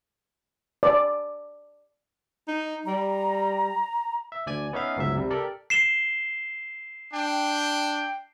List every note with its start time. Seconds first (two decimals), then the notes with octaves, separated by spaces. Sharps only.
0.83 D5
2.48 D#4
2.85 G3 A#5
4.32 E5
4.47 D2 D5 G#5 G#6
4.73 B3 C#4 D#4 E5 F5
4.97 G1 C#2 G#2 F#3 E5
5.16 C3 G3
5.30 G4 A4 A#4 D5
5.70 C7 E7 G7
7.14 D4 G5